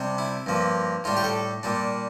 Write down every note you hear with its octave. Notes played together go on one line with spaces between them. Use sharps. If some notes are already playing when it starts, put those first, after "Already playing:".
Already playing: C3 G3 D4
E4
G2 F3 A#3
A2 G3 D4 F4
G4
A4
A#2 G3 D4